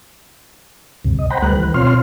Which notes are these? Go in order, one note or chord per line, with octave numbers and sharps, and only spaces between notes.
D2 G2 C3
D#5
C5 F#5 G5 A#5 B5
D2 G3 A3 B4 F#6
E3
B2 C4 F4 C#5 C6 F6